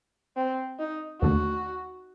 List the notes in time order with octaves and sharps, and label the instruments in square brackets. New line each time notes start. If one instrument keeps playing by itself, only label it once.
[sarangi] C4
D#4
[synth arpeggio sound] D#2 D3 A3 [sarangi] F#4